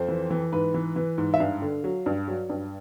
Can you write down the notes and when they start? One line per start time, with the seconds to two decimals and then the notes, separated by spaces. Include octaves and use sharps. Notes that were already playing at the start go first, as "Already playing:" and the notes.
Already playing: F2 C5
0.08 E3
0.30 E3
0.53 G#2 B4
0.74 E3
0.96 E3
1.18 G#2
1.34 E5
1.40 G2 F5
1.62 D3
1.84 F#3
2.06 G2
2.28 F#3
2.49 G2